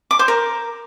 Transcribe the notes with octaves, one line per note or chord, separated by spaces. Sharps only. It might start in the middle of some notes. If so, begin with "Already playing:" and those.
D6
C5
A#4